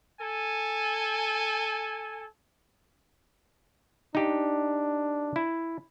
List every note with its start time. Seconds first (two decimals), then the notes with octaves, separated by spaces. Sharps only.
0.21 A4 G#5
4.15 D4 D#4 G4
5.36 E4